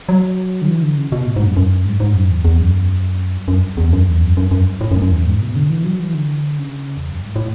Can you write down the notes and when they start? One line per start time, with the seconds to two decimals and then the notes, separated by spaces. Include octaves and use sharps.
0.09 F#3
0.62 D3
0.68 E3
0.83 D3
0.97 C#3
1.12 B2
1.26 A2
1.36 G#2
1.46 F#2
1.57 F#2
1.86 G#2
2.00 G#2
2.15 F#2
2.30 E2
2.45 E2
2.60 F#2
3.48 F#2
3.77 E2
3.93 F#2
4.08 E2
4.23 F#2
4.37 F#2
4.51 F#2
4.81 A2
4.91 F#2
5.02 F#2
5.11 E2
5.25 G#2
5.41 B2
5.56 D3
5.70 E3
5.84 F#3
6.00 E3
6.14 D3
6.58 C#3
6.97 E2
7.10 F#2
7.23 G#2
7.36 A2